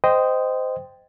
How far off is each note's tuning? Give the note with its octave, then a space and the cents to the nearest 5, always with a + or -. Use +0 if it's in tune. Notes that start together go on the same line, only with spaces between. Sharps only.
C5 -20 D#5 +0 G5 +0